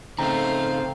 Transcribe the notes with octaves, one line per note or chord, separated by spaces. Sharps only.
C#3 A3 C4 D#4 F5 A#5